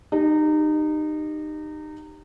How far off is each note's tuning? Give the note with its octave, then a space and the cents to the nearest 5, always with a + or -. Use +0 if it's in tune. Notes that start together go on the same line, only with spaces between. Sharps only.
D#4 -25 G4 +0